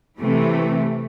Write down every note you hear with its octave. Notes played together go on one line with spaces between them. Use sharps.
C3 E3 A3